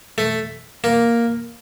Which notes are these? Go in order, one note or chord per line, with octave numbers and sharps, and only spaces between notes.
A3
A#3